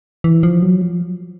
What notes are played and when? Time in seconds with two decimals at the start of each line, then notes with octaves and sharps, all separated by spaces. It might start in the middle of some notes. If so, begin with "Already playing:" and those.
0.24 E3
0.43 F3
0.63 F#3
0.82 F3